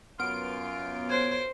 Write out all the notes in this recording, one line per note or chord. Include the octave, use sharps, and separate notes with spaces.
F#2 B3 F4 F6 D7
C5 C#5 G#6